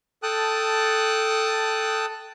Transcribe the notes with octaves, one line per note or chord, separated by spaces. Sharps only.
A4 G5 A5 D#6 F#6